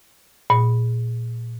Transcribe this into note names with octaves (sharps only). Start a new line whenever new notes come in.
A#2